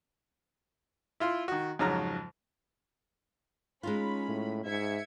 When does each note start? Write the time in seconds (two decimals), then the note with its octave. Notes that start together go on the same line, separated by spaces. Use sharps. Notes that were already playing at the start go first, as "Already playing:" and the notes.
1.20 E4 F4 C6
1.48 D#3 F#4
1.79 F2 G#2 C#3 F#3 A#5 F6
3.83 G#3 C#4 D#4 F4 B5
4.28 A2
4.66 G#2 E5 G#6 C#7